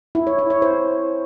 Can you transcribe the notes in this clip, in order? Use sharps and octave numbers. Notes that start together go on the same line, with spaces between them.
E4
C#5
E4
C#5
C5